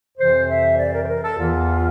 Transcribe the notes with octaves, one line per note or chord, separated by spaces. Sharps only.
F2 C3 E3 C5
E5
C5
D5
A#4
C5
A#4
A4
E2 E3 F4